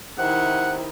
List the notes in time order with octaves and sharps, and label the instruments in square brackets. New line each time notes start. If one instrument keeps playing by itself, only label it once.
[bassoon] C3 [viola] D#3 E4 [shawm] F#5